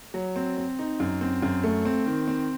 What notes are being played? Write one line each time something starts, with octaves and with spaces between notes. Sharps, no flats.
F#3
C4
C4
D#4
F#2
C4
F#2
A3
C4
D#3
C4